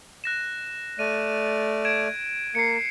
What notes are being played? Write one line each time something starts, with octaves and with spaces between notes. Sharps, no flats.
F#6 A#6 E7
A3 D5 F6 D#7
G#6 D7 E7
A#3 C7 C#7